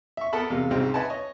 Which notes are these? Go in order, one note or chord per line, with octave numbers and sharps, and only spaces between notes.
E5 C#6
B3 A4 A#4 F#5 A5 B5
E2 C3 G#3 F5
C2 G#2 C#3 G#3 C4 C5
B4 D#5 E5 F#5 G#5 A5
C#5 D#5